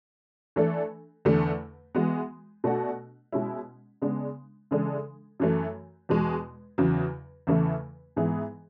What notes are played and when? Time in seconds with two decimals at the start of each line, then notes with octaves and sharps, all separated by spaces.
0.56 E3 A3 D4 A4
1.25 E2 D3 A3
1.95 E3 G#3 B3 F#4
2.64 B2 A3 D4 F#4
3.32 B2 G#3 C#4 E4
4.02 C#3 G#3 B3 D4
4.71 C#3 E3 G#3 D4 A4
5.40 F#2 E3 A3
6.09 E2 B2 G#3
6.78 E2 C#3 F#3
7.47 E2 C#3 E3 A3 E4
8.16 G#2 E3 B3 E4 G#4